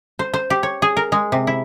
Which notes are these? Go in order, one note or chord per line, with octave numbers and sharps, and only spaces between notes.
C5
C5
G4
C#5
G#4
A#4
G#3
C3
E4